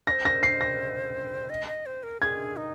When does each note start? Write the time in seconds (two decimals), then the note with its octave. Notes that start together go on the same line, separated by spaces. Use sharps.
0.07 C5 D#5 A#6
0.25 A#6
0.43 C7
0.61 A#6
1.50 D#5
1.67 D#5
1.86 C5
2.03 A#4
2.21 G#4 G#6
2.57 D#4